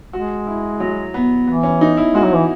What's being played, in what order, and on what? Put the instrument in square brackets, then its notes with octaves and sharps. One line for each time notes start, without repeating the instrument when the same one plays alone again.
[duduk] G#3 [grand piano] F#4
[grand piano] E4
F#3
B3
[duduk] E3 [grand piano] B3
[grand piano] C#4
D#4
E4
[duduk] G#3 [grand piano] F#4
[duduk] F#3
E3